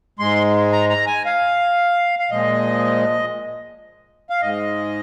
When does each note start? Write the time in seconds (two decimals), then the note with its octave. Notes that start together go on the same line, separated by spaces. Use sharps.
0.19 G#2 G#3 C6
0.72 A#5
0.90 A#5
1.07 G#5
1.26 F5
2.19 F5
2.31 A#2 F3 G#3 D#5
4.30 F5
4.42 G#2 G#3 D#5